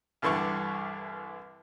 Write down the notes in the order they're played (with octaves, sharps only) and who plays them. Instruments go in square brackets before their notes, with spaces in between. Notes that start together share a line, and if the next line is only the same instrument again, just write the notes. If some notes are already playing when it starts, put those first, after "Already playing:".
[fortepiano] C2 G2 D3 E3 C#6